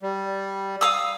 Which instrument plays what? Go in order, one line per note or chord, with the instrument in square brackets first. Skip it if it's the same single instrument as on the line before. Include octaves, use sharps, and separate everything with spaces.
[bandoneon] G3
[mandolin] F5 D#6 E6